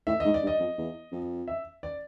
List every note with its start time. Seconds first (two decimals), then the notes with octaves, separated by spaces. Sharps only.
0.07 A2 E5
0.20 G#2 D#5
0.34 D5
0.42 G2
0.47 D#5
0.60 F2
0.78 E2
1.12 F2
1.48 E5
1.83 D5